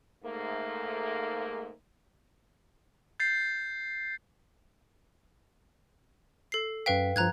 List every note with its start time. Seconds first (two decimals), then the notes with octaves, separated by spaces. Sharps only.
0.24 G#2 A3 A#3
3.20 G6 A6 C7
6.52 A4 C7
6.86 F#2 B4 F5 G5 B6
7.16 G2 F3 A#5 F#6 G#6